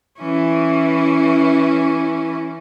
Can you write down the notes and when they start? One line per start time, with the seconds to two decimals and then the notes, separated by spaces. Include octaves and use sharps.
0.19 E3 C#4